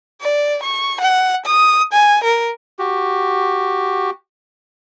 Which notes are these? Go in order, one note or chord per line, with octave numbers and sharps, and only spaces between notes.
D5
C#6
F#5
D#6
G#5
A#4
F#4 G4